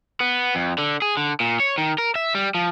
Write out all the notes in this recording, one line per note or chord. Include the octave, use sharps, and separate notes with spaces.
B3
F2
D3
G#4
D3
A#2
C#5
D#3
A#4
E5
G3
F3